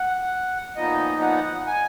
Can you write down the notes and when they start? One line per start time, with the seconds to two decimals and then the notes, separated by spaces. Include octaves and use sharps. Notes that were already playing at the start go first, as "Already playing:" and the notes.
Already playing: F#5
0.76 A#2 F3 B3 D#4 D#5
1.22 F#5
1.67 G#5